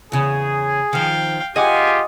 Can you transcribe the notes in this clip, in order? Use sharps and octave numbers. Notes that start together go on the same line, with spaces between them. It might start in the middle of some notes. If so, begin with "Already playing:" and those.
E2 C#3 G#4
D#3 F3 F5 G5
F4 G4 G#4 D#5 F#5 G#5 D6